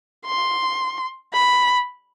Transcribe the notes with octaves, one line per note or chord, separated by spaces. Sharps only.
C6
B5